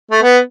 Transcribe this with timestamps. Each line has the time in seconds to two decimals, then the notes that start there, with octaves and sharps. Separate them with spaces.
0.11 A3
0.22 B3